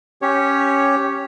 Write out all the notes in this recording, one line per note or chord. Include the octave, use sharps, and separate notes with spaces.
C#4 G4 C#5